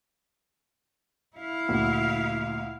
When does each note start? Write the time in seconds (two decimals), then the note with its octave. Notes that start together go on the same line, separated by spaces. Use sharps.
1.37 E4 F5
1.69 D2 A#2